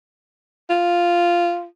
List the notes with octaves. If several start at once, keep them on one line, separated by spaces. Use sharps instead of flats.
F4